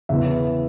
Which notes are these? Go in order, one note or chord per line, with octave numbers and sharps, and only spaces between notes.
E2 C#3 E3 B3 E5